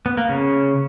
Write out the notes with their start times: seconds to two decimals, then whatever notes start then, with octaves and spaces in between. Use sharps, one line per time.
0.06 B3
0.17 A#3
0.29 C#3